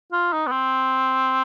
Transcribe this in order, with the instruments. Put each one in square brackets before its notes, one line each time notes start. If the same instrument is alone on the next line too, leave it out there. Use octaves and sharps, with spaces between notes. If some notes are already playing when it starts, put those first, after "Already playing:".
[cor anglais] F4
D#4
B3
C4